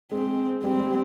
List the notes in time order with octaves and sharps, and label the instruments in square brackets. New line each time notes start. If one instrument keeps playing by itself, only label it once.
[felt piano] G#3 [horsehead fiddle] C4
[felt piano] G3 [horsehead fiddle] C4
[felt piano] G3